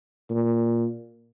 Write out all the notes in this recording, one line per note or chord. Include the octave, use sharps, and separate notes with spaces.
A#2